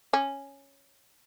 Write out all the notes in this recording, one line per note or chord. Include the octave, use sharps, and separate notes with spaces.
C#4